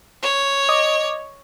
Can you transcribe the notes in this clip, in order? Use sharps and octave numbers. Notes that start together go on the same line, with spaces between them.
C#5
D#5 D6